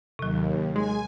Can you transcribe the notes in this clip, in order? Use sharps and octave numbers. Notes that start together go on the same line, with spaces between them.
D#2 C3 F#3
G#3 G#5